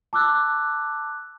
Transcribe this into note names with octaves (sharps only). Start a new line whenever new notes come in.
A5 D6 E6 F#6